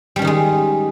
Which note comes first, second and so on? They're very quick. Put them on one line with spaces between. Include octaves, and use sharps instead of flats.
G3 C#4 D#3 D#4 G#3